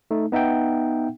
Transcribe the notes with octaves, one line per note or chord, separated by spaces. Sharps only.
A3 D#4
B3 D#4 E5 F#5 G5